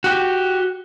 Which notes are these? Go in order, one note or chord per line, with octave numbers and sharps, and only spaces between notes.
F#4 G4